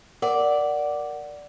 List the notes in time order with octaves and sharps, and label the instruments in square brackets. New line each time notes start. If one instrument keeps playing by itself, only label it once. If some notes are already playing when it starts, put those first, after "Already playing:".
[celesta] A#4 F#5 [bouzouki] D5